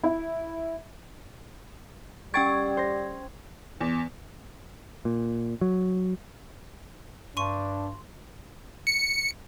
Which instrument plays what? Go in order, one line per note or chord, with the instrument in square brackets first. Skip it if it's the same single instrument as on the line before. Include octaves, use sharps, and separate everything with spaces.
[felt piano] E4
[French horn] G3 [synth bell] C#4 G5 G#6 [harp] C#6 A6 D7
[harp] C5 A#6
[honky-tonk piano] E2
[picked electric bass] A#2
F#3
[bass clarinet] G2 [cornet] D4 [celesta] C6 [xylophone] C#6 D#7
[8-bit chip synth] C#7